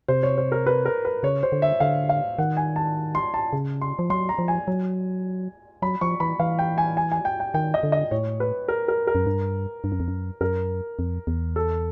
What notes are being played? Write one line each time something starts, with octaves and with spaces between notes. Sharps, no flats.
C3 C5
C#5
C5
A#4
B4
A#4
B4
C#3 C#5
C5
D3
E5
D3 F5
F5
D#3 F#5
G#5
A5
C6
A5
C#3
C6
F3
F#3 C6
A#5
F3
G#5
F#3
F#3 B5
F3 C#6
E3 B5
E3 F5
G5
G#5
G#5
G#5
G5
G5
D#3 G5
D#5
D3
D#5
A2 C#5
B4
A#4
A#4
A#4
F#2
G2
G2
F#2
F2
F#2
F#2 A#4
F2
E2
A4